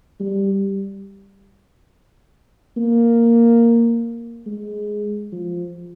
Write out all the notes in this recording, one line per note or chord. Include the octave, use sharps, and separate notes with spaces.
G3
A#3
G#3
F3